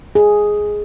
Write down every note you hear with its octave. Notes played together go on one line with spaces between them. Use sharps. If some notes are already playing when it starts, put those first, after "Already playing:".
G#4